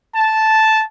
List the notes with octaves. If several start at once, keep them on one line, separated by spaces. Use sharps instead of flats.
A5